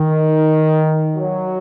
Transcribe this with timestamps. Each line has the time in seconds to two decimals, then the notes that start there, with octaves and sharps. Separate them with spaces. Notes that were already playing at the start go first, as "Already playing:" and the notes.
Already playing: D#3
1.16 F#3